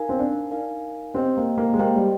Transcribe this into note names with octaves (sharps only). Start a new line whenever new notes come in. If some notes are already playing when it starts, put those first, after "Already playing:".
Already playing: D#4 A#4 F5 G#5
C4
D4
D#4 A#4 F5 G#5
C4 G4 C5 D#5 G5
A#3
A#3
G#3
A#3 G4 C5 D#5 G5
G3